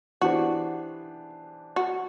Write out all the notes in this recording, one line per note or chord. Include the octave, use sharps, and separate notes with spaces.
E3 B3 D4 F#4 G4 C5
F#4